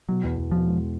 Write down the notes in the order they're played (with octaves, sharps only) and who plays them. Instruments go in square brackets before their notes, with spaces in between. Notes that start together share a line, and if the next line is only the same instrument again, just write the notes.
[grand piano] B2 [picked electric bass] F#3
[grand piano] E2
E2
[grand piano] B2 [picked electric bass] F3
[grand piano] G#3